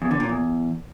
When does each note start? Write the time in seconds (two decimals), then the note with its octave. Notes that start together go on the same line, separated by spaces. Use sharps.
0.02 E2
0.11 D3
0.20 A#2
0.29 E2